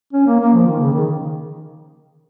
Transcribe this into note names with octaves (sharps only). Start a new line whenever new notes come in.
C#4
A#3
A#3
F3
D#3
C#3
D#3